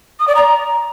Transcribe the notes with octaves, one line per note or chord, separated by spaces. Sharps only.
D#6
D5
A#5